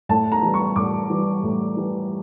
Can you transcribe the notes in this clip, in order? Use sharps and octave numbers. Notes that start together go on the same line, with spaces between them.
A2 A5
A#5
E3 G3
C#6
A2 D6
E3 G3
A2
E3 G3